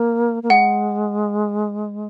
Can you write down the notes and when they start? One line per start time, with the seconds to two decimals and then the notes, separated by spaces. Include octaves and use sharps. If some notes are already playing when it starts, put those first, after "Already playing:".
Already playing: A#3
0.43 A#3
0.50 G#3 F#5